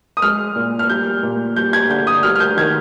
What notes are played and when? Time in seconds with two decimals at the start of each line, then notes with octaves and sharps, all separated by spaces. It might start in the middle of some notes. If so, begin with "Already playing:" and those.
0.17 D#6
0.22 G#3 F6
0.56 A#2
0.79 F6
0.90 G3 G6
1.23 A#2
1.56 G3 G6
1.73 G#6
1.90 D3 G6
2.07 D#6
2.23 G3 F6
2.35 F6
2.40 G6
2.57 D#3 G#6